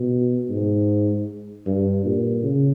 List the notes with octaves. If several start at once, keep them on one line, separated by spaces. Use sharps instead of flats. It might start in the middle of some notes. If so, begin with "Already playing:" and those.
Already playing: B2
G#2
G2
A#2
C#3